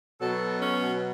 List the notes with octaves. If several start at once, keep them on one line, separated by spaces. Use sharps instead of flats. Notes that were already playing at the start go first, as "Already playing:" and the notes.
B2 F#3 A4
C#4